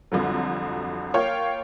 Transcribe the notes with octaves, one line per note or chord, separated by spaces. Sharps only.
C2 F2 D3 F#3
A#3 F4 C#5 F5 G5